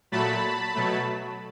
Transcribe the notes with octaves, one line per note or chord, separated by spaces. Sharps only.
A#2 F#3 A3 A5 B5
B2 F#3 A3